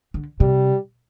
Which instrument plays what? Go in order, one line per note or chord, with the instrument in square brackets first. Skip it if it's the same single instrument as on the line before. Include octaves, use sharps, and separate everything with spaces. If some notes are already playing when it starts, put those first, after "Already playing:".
[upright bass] D3
[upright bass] C3 [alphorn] G3